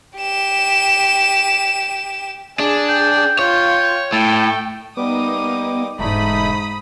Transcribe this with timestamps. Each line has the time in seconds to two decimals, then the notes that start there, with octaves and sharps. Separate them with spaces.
0.17 G4 E7
2.59 D4 G#4
2.89 G5
3.39 F4 C#5 G5
4.13 A2 A4 G5
4.97 G3 A#3 B3 D#4 D6 D#6
5.99 E1 G#2 A3 D#4 B5 D#6